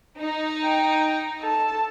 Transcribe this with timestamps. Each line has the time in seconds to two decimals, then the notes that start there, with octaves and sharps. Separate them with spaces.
0.19 D#4
0.64 G5
1.41 A4 A5